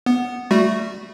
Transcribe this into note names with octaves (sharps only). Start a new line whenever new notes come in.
B3
G3 A3 F#4